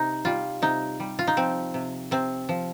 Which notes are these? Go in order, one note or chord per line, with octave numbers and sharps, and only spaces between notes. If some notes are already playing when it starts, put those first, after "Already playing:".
Already playing: C3 D#4
G3 F4
C3 D#4
G3
F4
D#4
F3 C4
C3
C3 C4
F3